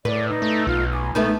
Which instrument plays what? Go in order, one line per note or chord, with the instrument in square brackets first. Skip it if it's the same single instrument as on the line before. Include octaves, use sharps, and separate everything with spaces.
[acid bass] A2 [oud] B4 [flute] D5
[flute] D#4
[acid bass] A3
[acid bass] B1 [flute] F4
[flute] G#5
[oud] A3 B3 D#4 [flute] A5